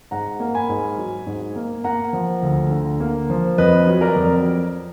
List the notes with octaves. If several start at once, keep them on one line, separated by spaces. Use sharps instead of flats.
G#2 F#5 A#5
A#3
G#5 B5
G#2
F#3
G#2
A#3
A#3 F#5 A#5
F3
D2
D3
A#3
F3
F2 B4 D#5
F#3
A#4 D5
F2